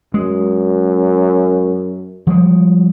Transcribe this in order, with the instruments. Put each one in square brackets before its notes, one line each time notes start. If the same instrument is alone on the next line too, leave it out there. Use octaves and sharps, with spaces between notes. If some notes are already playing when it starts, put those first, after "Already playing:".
[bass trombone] F#2 [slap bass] G#3
[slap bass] F3 G3 G#3